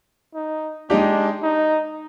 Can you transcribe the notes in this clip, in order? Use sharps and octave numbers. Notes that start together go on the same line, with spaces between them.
D#4
G#3 D4 D#4 G4
D#4